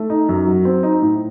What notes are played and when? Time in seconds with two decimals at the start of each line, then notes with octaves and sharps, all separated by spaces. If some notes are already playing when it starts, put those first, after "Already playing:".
Already playing: A3
0.10 D#4
0.29 F#2
0.47 F#3
0.65 C4
0.83 D#4
1.02 A2